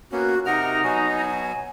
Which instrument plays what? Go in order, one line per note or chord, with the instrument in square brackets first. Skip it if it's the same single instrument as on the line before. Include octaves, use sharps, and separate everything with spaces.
[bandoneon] A#3 B3 C#4 [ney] F#4
[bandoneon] C3 A#4 F6 [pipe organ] D#4 A#5 [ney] F#5
[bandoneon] B2 F#3 F#4 [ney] G#5